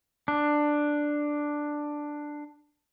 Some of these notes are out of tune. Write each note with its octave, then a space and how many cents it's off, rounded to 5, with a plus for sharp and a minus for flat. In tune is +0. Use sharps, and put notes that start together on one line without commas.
D4 +5